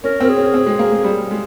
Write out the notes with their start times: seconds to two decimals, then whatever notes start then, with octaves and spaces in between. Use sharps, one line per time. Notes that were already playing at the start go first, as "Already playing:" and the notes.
0.04 C#4 A#4
0.20 C4 A#4
0.29 G#4
0.37 C#4
0.54 C4
0.66 G#3
0.79 A#3
0.92 G#3
1.04 G3
1.31 G#3